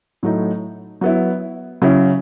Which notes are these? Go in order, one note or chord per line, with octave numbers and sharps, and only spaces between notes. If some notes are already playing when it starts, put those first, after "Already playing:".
A2 F#3 A3 D#4
F#3 B3 E4
C#3 F#3 C#4 E4